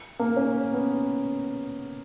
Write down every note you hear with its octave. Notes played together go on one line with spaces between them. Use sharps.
A#3
C#4
B3